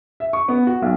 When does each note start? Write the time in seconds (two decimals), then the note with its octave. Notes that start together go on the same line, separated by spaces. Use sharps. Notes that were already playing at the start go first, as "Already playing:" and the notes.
0.20 E5
0.33 C#6
0.48 B3
0.67 F#4
0.82 B1